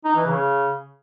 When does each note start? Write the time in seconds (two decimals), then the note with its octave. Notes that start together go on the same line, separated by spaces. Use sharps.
0.05 D#4
0.16 E3
0.27 C#3